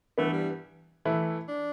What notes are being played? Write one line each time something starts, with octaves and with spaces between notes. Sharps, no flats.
G2 E3 A3 B3
G3
E3 A3 E4
D4